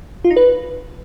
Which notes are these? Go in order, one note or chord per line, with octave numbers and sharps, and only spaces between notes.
F4
D#4
B4